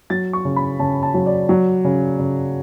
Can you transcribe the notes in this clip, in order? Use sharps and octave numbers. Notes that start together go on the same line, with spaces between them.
F#3 A6
C#6
C#3
B5
C#3 A5
A5
F#3
D5
F#3
C#3
C#3